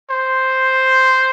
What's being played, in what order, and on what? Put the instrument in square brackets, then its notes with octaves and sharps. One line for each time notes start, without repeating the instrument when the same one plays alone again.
[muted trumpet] C5